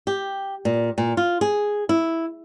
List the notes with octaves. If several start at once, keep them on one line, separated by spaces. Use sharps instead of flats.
G4
A#2
A#2
F4
G#4
E4